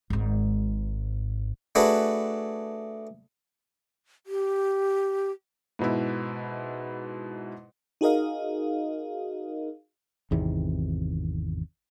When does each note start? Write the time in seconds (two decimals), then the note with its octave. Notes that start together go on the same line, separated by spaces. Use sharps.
0.10 G#1 G#2
1.75 A3 D4 F#4 G#4 B4
4.26 G4
5.79 G#2 B2 E4
8.01 D#4 F#4 G#4 A#4 D#5 F5
10.31 G#1 E2 C3 D#3